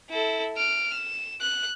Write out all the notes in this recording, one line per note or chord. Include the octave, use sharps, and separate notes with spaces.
E4 A4
F6 D7
E7
F#6